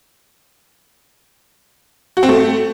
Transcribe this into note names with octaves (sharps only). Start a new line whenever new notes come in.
F#4
C4
A3